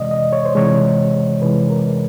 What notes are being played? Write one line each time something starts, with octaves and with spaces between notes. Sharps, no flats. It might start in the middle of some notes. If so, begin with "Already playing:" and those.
Already playing: C3 E3 G#3 D5 D#5
D#5
C#5
C5
C3 E3 G#3 C#5
C3 E3 G#3 B4
A#4